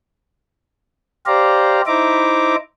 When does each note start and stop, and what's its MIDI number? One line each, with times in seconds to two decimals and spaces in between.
1.26 1.81 67
1.26 1.81 72
1.26 1.81 74
1.26 1.81 77
1.26 1.81 82
1.87 2.55 63
1.87 2.55 64
1.87 2.55 72
1.87 2.55 76
1.87 2.55 82
1.87 2.55 86